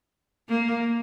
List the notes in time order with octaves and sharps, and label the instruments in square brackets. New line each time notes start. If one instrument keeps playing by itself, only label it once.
[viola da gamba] A#3